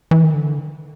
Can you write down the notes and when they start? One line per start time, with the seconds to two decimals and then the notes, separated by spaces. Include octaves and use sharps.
0.11 E3
0.23 D#3
0.34 D3